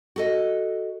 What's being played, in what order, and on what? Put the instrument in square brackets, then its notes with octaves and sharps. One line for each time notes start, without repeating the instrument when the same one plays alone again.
[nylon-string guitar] F#4 A4 D#5